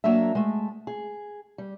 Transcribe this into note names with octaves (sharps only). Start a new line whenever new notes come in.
F#3 A#3 D4 A#4 E5
G#3 A3
G#4
G3